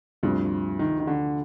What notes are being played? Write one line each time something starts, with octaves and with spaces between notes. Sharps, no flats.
D2 G2 C3 F3
D#3
D#3
D3